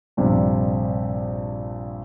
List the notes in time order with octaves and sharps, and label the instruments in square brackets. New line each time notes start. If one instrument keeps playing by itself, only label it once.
[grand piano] A#1 G2 C3